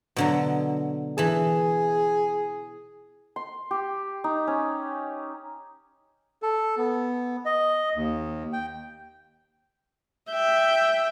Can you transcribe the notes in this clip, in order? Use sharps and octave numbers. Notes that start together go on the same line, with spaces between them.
B2 D3 F#3
E3 G#4 A5
C6
G4
D#4
C#4
A4
B3
D#5
D#2
G5
E5 G5